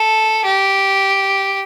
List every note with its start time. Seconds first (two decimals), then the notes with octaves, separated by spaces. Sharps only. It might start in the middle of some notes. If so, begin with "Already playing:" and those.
Already playing: A4
0.45 G4